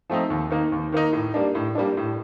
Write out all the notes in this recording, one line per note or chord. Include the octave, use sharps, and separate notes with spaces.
F3 A3 C4 D#4
D#2
D#3 A#3 D#4
D#2
D#3 A#3 D#4
A2
G3 A#3 D4
A2
G3 A#3 D4
A2